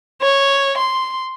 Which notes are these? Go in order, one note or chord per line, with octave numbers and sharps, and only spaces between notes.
C#5
C6